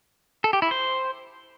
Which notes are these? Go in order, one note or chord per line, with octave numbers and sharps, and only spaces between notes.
A4
G4
E4
C5